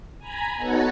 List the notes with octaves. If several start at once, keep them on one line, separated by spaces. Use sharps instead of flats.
G#5 A#5 B5
B3 D#4 F#4 A4 B4 C#5